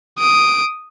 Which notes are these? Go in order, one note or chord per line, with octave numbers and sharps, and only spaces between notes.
D#6 D7